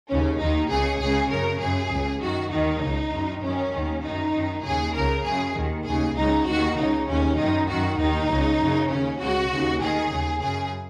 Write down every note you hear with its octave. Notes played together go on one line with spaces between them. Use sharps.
D#2 C#3 C#4
D#2 D#3 D#4
C#2 C#3 G#4
C#2 C#3 G#4
F#2 C#3 A#4
F#2 C#3 G#4
C#2 C#3
F#2 D#3 F#4
D#2 D#3 D#4
C#2 C#3
F#2 D#3
F#2 D#3 C#4
D#2 D#3
F#2 D#3 D#4
F#2 D#3
D#2 C#3 G#4
C#2 C#3 A#4
F#2 C#3 G#4
D#2 D#3
D#2 C#3 G#4
C#2 C#3 D#4
D#2 D#3 F#4
C#2 C#3 D#4
D#2 C#3 C#4
F#2 D#3 D#4
F#2 D#3 F#4
D#2 D#3 D#4
C#2 C#3
F#2 C#3
D#2 C#3 C#4
C#2 C#3 F#4
D#2 C#3
D#2 D#3 G#4
D#2 C#3
F#2 C#3 G#4